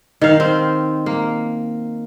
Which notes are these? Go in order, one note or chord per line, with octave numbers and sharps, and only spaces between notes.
D#3 F5
C4
A#3